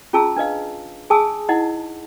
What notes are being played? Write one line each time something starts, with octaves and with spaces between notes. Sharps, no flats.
C#4 F4 G#4 A5 A#5 E6
D4 B4 D#5 F5
G#4 G#5 A5 D#6 E6
D#4 E4 D#5 F#5